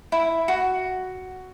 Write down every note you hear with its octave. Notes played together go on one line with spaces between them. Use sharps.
E4
F#4